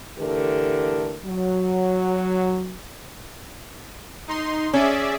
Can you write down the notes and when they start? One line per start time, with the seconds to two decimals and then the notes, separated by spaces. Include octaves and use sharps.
0.19 D3 E3 A3 G4 A#4
1.25 F#3
4.28 D#4 C6
4.73 C#4 G#4 D5 E5